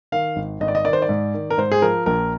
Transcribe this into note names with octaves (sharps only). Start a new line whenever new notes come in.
D#3 F5
G#1
G#1 D#5
D5
D#5
D#3 D5
C5
D5
G#2
D#3
A#4
G#2 C5
G#4
F3 A#4
A#1 A#4